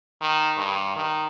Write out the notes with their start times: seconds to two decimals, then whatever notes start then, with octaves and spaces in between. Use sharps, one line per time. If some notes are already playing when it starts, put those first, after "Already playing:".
0.21 D#3
0.58 G2
0.96 D#3